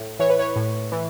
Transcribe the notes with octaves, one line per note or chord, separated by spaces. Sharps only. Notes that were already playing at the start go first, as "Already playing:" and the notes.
Already playing: A2
E3 C#5
B4
C#5
A2
E3